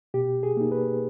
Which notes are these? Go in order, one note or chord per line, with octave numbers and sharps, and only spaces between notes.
B2 G4
G#4
A#3 D#4
B4